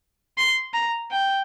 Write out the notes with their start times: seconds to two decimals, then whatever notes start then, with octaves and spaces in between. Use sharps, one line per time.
0.37 C6
0.74 A#5
1.11 G5